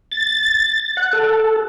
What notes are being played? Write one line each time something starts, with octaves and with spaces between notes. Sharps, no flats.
A6
F#5
A4